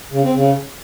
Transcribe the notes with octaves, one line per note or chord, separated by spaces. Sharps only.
C#3
C4
C#3